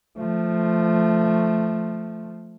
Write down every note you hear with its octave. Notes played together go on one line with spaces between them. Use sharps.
F3 A3